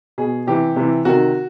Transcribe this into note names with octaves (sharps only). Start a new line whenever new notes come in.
B2 G#4
C3 E3 G4
C3 E3
C3 D#3 F#4